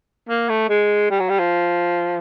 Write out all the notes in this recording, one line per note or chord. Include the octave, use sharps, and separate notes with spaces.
A#3
A3
G#3
G3
F#3
G3
F3